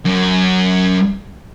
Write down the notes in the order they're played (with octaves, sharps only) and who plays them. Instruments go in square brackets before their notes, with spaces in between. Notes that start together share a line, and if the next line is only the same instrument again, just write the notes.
[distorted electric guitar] F#2